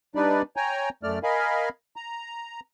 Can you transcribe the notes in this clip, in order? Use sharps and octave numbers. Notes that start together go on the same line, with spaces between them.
G3 D4 D#4 B4 D5
C#5 G5 G#5 A#5
F#2 A3 D5 F6
A#4 D#5 F5 G#5 B5
A#5